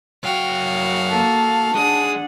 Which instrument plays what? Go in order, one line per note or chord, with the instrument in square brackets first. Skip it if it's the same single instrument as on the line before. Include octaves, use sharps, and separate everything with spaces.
[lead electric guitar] F#2 G5 [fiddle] F#4 F5
[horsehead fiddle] A#3 A4 [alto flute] A5
[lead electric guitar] G#3 G#4 [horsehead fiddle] D4 F#5 [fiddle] D#6